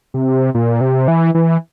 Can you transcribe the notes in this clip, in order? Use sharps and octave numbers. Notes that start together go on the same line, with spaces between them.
C3
A#2
C3
E3
E3